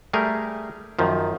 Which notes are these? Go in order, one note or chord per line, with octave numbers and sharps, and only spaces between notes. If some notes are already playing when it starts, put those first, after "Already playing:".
G3 A3 G#4 A#4
F#2 D#3 F3